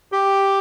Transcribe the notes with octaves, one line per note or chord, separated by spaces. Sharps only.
G4